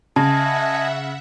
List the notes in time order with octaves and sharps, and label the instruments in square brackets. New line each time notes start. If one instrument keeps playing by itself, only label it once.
[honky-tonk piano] C#3 [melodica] D#5 G#5 [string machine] E5 F#5 [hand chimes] A5